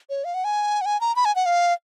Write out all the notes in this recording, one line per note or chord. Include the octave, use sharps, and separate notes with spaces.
C#5
F5
F#5
G#5
F#5
G#5
A#5
B5
G#5
F#5
F5